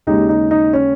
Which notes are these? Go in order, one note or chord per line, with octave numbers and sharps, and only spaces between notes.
D#2 C#3 G#3 D#4 G4
D#4
D#4
C#4